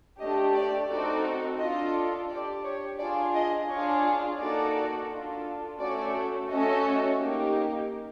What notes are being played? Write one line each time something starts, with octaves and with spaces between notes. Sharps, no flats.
A3 D4 G4 D#5
D5
C4 D#4 F#4 A4 D5
D4 F4 A4 D#5
D4 G4 D5
C#5
D4 F4 G#4 D5
D#5
D4 F4 G#4 C#5
A#3 D#4 F#4 A4 D5
D4 F4 A4
A3 C#4 F#4 A4 D5
A3 C#4 F#4 A4 D#5
A#3 D#4 G4